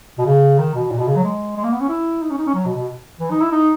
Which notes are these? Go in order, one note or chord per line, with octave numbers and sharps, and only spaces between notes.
B2
C#3
D#3
B2
A#2
B2
C#3
F#3
G#3
G#3
A#3
B3
C#4
E4
D#4
C#4
D#4
C#4
F#3
B2
B2
E3
D#4
E4
D#4